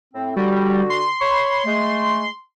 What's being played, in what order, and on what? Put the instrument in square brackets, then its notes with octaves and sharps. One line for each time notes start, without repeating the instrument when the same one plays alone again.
[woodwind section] A2 C4
[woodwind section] D3 F#4 [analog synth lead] G3
[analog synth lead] C6
[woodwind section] C#5 B5 C#6
G#3 A3